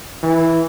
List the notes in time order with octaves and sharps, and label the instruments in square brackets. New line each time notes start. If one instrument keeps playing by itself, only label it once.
[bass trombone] E3